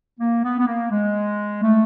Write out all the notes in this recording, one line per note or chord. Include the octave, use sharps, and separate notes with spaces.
A#3
B3
B3
A#3
G#3
A3